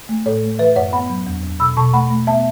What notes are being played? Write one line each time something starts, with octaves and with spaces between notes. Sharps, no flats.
A3
A2 A4 C#5
A3
E3 B4 E5
F#2 C#5 F#5
B3 F#5 B5
F#3
E2
E2
B2 B5 E6
B2 A5 C#6
A3 F#5 B5
A3
B3 E5 A5